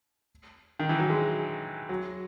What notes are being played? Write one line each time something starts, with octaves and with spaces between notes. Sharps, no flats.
D#3
E3
F#3
G#3
F#3